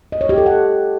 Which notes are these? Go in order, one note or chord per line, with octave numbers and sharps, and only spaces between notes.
D#5
C#5
G4
A4
F#5